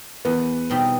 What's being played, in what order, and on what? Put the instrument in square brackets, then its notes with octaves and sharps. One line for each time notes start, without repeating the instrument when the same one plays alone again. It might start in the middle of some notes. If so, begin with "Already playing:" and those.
[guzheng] E2 [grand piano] B3
[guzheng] B2 G3 C4 D#4